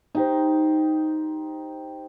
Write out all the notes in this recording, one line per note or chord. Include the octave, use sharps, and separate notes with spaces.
D#4 G4 C5